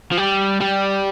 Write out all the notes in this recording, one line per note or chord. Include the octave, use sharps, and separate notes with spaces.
F3
G3
G3